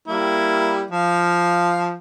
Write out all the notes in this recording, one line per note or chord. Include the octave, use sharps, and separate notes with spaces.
G3 A#3 E4
F3 F5